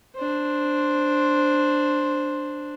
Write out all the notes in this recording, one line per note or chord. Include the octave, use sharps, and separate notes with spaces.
D4 C5